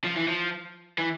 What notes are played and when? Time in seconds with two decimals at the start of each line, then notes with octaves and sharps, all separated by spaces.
0.04 F3
0.16 E3
0.28 F3
0.98 E3